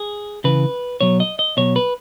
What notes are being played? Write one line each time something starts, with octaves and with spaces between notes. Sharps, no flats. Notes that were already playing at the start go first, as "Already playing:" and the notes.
Already playing: G#4
C#3 E3 B4
B2 F#3 C#5
D#5
D#5
B2 F#3 C#5
B4